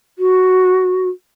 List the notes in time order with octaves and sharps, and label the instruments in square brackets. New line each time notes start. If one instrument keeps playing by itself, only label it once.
[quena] F#4